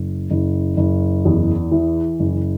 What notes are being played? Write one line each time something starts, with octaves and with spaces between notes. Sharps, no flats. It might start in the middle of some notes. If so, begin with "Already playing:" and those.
Already playing: F#1
F#1
F#1
E2
E3
F#1